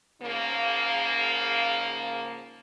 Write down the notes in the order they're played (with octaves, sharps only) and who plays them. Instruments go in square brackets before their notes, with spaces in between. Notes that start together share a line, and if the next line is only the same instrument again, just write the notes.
[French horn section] G#2 C#3 F3 A#3